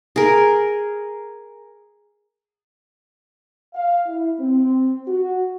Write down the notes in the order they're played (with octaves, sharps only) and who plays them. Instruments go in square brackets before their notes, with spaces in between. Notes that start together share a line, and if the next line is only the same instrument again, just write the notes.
[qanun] G#4 A#4
[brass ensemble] F5
E4
C4
F#4